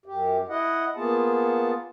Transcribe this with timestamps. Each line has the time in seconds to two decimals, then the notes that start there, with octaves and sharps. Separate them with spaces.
0.06 F#2 G4
0.49 E4 D#5 F#5
0.96 A#3 B3 F4 G#4 A5